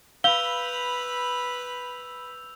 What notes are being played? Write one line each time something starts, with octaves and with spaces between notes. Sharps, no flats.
B4 F5 B5 E6 G6 F7 G7